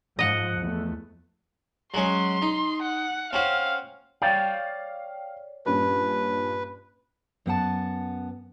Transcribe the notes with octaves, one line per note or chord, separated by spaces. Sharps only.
G#2 F3 D#5 F#5
E2 A3
F#3 G#3 C#4 C6
D#4
F#5
C4 C#4 F#4 F5
C#5 D5 F5 G5
G2 A#2 C#4 B4
F#2 B3 F#5 A5